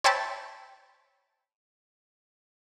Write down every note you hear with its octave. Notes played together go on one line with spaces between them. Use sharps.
C5 C#5 E5 G5 A5 B5